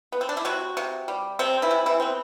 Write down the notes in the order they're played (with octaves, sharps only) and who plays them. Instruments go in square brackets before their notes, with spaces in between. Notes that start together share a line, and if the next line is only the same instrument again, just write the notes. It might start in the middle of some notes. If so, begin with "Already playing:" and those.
[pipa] B3
C4
D4
E4
C3 F#3 F#4
C3
G3
C3 C4
E3 E4
C3
E3 E4
B3 C4